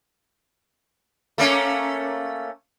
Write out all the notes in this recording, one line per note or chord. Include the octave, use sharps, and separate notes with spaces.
A3 A#3 C#4